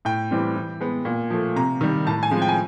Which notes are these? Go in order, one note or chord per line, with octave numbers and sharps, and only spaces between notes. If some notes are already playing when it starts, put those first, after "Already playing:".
A2 G5
E3 G3 C4
E3
G#3 B3
A#2
F3 A3
C3 A#5
D#3 G3
A2 A5
G#5
F3 G#3 C4
G5
G#5